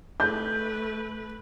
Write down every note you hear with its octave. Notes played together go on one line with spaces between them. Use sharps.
A3 B4 G6